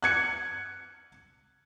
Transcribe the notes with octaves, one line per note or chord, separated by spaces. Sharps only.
F#6 G#6 C#7